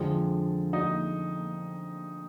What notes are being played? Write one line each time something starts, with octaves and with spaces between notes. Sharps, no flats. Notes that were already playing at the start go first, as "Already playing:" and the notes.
Already playing: F2 D3 F3 G#3
D#4 D#5